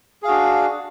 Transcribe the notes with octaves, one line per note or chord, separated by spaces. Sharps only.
D4 F#4 G#4 F5